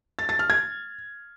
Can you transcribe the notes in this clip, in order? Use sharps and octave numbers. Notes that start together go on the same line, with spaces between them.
A6
A6
F6
G#6